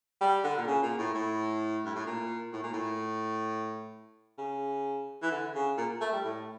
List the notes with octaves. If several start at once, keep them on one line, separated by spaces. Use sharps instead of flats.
G3
D3
A#2
C#3
A#2
A2
A2
G2
A2
A#2
A2
A#2
A2
C#3
E3
D3
C#3
A#2
A3
G3
A2